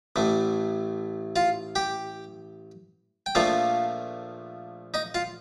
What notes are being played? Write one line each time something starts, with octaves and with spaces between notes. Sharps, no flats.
A1 A2 A3
F4 F5
G4 G5
G5
A#1 A#2 F3 A3 F4 F5
D#4 D#5
F4 F5